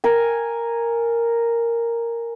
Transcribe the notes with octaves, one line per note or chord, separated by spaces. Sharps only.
A#4 G#5